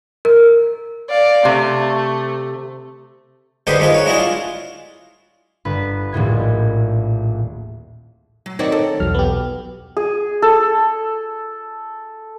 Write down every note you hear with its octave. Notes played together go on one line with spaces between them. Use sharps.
A#4
D5 F5
C3 A3
G#2 D3 G4 B4 C5 D#6
D#3 G#3 F4 G#5
C#5 F#5
G#3 D4 E4 F#4 G#4
F4
G1 B4
D#1 A#1 A2 G#6
F#3
D#3 C4 D#4 F#4 C#5 D5
A4
B1 E2 F#3 F6
B3 G4
G#4
A4